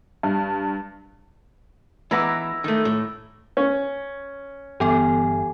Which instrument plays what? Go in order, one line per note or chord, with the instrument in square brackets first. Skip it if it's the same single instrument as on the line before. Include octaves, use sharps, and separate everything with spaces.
[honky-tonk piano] G2
[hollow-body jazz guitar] E3 B3 [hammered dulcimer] E4 A#5 D6
[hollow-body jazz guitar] D#3 A3
A2
[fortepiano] C#4
[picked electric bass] G1 [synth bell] E3 B3 A4 [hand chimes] G4 G#5